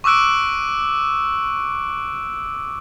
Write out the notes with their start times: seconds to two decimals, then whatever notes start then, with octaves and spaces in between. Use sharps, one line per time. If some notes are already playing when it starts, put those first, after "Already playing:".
0.04 C#6 D6 E6 F#6 D7